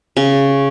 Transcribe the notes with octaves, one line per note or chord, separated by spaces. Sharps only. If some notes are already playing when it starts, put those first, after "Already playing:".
C#3